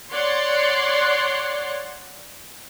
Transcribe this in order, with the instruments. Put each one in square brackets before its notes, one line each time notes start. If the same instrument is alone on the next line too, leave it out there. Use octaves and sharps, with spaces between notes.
[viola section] C#5 D5 F#5 C6